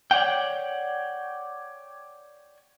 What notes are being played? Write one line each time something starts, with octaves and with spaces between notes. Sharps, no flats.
C#5 D5 F#5 G5